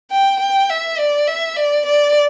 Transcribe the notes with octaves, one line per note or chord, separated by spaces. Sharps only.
G5
G5
E5
D5
E5
D5
D5